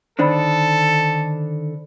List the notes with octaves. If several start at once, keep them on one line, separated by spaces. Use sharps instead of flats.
D3 D#3 D4 A4 C5 D5 B5